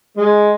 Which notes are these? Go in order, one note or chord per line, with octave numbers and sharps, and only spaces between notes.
G#3